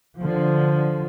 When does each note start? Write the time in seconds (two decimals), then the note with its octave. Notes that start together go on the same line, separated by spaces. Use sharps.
0.20 D3 F3